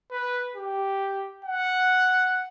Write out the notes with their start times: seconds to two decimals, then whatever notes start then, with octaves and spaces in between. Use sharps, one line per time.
0.11 B4
0.56 G4
1.44 F#5